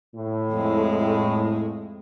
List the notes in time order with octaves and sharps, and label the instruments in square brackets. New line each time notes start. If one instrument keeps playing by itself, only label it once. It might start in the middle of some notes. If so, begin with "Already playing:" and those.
[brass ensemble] A2
[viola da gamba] F2 G#3